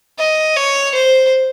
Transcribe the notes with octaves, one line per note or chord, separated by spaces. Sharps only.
D#5
C#5
C5